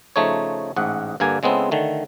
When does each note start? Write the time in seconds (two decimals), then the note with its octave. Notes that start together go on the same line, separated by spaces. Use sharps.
0.16 C#3 F3 A3 D#4 C#5
0.76 A1 G#2 F#5
1.20 G2 D3 A#3 G#5
1.43 C#3 G#3 B3 C4 E4 A4
1.71 D3 D#3 A3